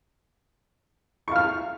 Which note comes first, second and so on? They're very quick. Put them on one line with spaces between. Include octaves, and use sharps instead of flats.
C#6 F5 F6